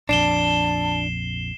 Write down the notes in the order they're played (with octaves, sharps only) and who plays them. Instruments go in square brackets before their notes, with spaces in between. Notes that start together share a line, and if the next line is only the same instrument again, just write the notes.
[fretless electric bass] A#1 F2 [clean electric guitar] D4 [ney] A5 [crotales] C7 E7 G7